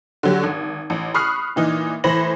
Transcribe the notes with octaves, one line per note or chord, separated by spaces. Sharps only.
D3 F#3 G4
G#1
A1
B5 C#6 D#6 F6 F#6 C7
A#2 E3 D#4
A2 E3 C5 B5 A#6 F#7